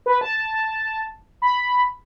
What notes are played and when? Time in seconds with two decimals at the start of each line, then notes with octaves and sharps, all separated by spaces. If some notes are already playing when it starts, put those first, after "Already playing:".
0.06 B4
0.21 A5
1.42 B5